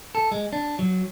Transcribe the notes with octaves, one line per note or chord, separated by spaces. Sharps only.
A4
G#3
D4
F#3